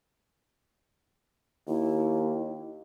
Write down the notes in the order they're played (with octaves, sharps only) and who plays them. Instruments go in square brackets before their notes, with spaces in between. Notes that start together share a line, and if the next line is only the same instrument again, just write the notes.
[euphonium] D#2 [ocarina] E4